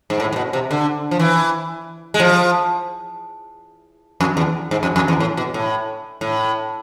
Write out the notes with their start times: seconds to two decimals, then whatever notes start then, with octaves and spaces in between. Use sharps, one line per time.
0.10 G#2
0.20 A2
0.33 A2
0.36 B2
0.53 C3
0.71 D3
1.11 F3
1.19 E3
2.14 G#3
2.20 F3
4.21 F2
4.37 E2
4.71 G#2
4.83 F2
4.96 F2
5.08 E2
5.20 A2
5.37 B2
5.54 A2
6.21 A2